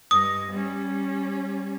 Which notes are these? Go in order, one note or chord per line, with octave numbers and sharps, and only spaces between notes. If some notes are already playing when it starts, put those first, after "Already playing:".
G2 D#5 D#6
G3 C#4